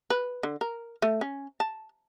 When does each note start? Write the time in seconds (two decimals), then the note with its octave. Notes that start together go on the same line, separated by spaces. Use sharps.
0.10 B4
0.43 D3
0.61 A#4
1.02 A3
1.21 C#4
1.60 A5